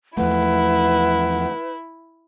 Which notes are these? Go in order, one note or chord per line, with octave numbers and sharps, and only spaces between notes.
E2 F3 A3 E4 B4 F#5